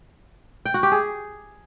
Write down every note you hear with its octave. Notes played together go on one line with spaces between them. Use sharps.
G5
F#4
G4
G#4